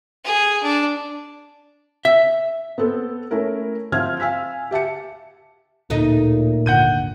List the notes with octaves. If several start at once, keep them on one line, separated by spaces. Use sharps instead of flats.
G#4
D4
E5
B3 C4 A4
A3 C#4 E4 A#4
F3 C4 E5 F6 G#6
F5 G#5 E6 B6
G4 E5 A5 C#7
D1 A#2 A3 D#4
D#1 G#1 D3 F#5 G6 D#7